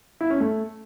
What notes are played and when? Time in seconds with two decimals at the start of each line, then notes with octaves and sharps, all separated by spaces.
0.21 E4
0.30 C#4
0.40 A3